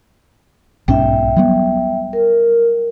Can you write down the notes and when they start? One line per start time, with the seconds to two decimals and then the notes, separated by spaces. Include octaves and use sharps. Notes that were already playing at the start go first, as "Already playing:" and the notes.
0.88 B1 G#2 C#4 E5 G5
1.36 F#3 G3 B3
2.13 A#4